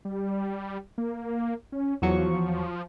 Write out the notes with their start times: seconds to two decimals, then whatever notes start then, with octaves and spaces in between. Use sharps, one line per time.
0.05 G3
0.98 A#3
1.72 C#4
2.02 E2 F3 F#3 C#6